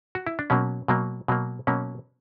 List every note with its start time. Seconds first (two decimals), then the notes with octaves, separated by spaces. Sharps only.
0.15 F#4
0.27 E4
0.39 D4
0.50 B2 F#3 A#3 C#4
0.88 B2 F#3 A#3
1.28 B2 F#3 A#3
1.67 B2 F#3 A#3 C#4